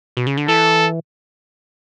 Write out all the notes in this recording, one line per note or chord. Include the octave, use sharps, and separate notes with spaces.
B2
C#3
D3
E3 A4